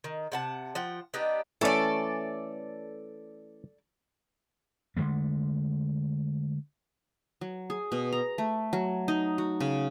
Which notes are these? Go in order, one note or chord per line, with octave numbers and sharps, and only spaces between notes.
D#3
C3 F#5 A5
F3 F#5 G5
B3 D4 D#4 G4
E3 A3 C#4 A4 D5
D3 E3 G#3 A3
F#3
G#4
B2
A#5
A3
F#3
D#4
F#4
C#3